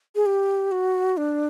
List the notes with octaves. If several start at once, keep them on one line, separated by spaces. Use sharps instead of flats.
G#4
G4
F#4
D4